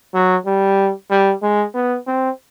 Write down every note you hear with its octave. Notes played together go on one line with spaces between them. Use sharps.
F#3
G3
G3
G#3
B3
C4